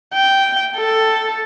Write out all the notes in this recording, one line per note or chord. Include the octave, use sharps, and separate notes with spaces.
G5
A4